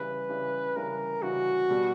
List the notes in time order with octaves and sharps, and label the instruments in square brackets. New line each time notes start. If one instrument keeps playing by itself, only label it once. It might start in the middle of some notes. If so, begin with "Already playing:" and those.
Already playing: [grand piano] C#3 E3 G3 [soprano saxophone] B4
[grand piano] C#3 E3 G3
[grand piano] C#3 E3 G3 [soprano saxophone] A#4
[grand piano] C#3 E3 G3 [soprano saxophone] F#4
[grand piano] B2 G3 B3